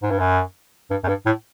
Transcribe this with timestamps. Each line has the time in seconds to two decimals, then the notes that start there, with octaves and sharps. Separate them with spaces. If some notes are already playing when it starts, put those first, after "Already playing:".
0.03 G#2
0.11 G2
0.20 F#2
0.90 G2
1.04 F#2
1.08 G2
1.26 A2